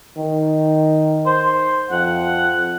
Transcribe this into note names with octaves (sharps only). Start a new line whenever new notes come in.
D#3
C5
F2 F#5